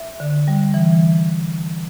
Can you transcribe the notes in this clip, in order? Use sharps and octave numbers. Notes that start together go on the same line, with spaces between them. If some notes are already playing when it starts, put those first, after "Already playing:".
Already playing: E5
D3
G3
E3